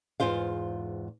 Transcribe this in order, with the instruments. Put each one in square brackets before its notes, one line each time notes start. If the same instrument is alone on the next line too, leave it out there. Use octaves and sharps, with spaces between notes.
[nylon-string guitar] E2 G#2 F4 C5 F5